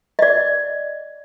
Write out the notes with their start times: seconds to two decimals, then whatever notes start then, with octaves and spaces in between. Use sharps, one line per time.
0.19 D5 D#5